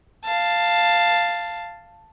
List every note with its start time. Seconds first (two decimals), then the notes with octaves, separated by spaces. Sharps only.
0.25 F5 A5